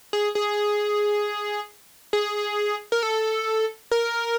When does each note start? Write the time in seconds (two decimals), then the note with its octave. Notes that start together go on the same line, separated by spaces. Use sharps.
0.13 G#4
0.35 G#4
2.13 G#4
2.92 A#4
3.03 A4
3.91 A#4